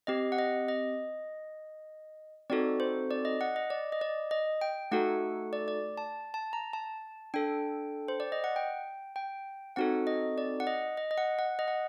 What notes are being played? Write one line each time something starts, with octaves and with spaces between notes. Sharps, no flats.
C4 G4 D#5
F#5
D#5
D#5
C4 D#4 F#4 A4 D5
C5
D5
D#5
F#5
D#5
D5
D#5
D5
D#5
G5
A3 D#4 F#4 A4 F#5
D5
D5
A5
A5
A#5
A5
D4 A4 G5
C5
D5
D#5
F#5
G5
G5
C4 D#4 F#4 A4 F#5
D#5
D5
F#5
D#5
D#5
D#5
F#5
F#5
D#5
F#5